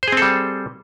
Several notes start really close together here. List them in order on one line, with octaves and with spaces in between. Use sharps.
C5 G#4 C4 A4 G3